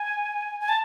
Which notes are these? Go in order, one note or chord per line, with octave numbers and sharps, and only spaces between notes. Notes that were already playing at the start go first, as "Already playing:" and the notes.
Already playing: G#5
G#5
A5